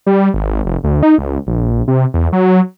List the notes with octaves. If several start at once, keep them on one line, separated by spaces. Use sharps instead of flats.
G3
G#1
F1
D2
D#4
C#2
A#1
C3
E2
F#3